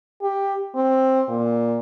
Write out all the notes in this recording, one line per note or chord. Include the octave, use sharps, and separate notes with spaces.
G4
C4
A#2